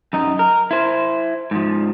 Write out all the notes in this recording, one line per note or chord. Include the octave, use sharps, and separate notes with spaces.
F#2 D#4
A#4
E4 C5
G#2 F3